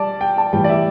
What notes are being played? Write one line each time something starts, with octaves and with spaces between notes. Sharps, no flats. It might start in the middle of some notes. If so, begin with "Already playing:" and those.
Already playing: G3 D5 A5
G5
A5
A2 E3 G3 G5
D5
E5